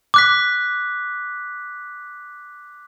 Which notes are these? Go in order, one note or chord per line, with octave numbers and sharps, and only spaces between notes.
D6 F#6 B6